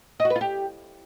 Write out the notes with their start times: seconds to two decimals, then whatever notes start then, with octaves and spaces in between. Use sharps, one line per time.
0.20 D#5
0.25 F#4
0.30 B4
0.36 F4
0.41 G4